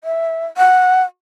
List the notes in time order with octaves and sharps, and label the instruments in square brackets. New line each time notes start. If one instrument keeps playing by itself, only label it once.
[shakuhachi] E5
F#5